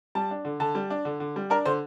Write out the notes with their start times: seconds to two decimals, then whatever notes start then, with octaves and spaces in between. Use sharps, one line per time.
0.15 G3 A5
0.31 D4
0.45 D3
0.60 D3 A5
0.75 G3
0.90 D4
1.05 D3
1.20 D3
1.36 G3
1.50 D4 A#4
1.66 D3 C5